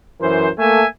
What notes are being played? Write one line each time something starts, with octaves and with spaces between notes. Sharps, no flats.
F#2 E3 A#4 C5
A3 A#3 A4 E5 G#5